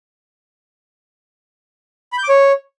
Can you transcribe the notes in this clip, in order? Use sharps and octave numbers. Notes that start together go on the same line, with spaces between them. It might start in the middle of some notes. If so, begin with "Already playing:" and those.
B5
G6
D6
C#5